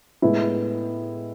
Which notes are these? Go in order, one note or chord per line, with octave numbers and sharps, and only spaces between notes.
A2 G#3 B3 E4